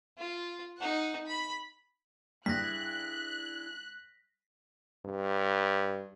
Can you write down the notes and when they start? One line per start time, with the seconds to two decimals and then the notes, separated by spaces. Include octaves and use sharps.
0.18 F4
0.78 D#4 F#5
1.27 B5
2.46 G2 D4 E4 G#4 F#6 A#6 B6
5.05 G2